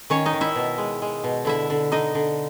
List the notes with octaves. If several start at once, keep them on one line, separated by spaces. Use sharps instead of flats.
D#3 C#4 C#5
D#4 D#5
D#3
E4 E5
B2
G#3
G#3
B2
D3 E4 E5
D3
D3 D#4 D#5
D3